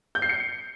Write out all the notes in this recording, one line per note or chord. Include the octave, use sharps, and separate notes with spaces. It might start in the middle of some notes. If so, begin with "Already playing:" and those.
G6
C7
C#7